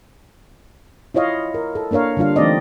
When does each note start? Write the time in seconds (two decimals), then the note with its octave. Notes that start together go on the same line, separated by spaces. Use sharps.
1.14 E4 F4 C#5 D#5 F5
1.54 A#4
1.75 A4
1.91 A#3 D4 A#4 C#5 F5
2.17 D3 G3 D4 F4 F5
2.36 E3 A3 C4 D#4 D5 D#5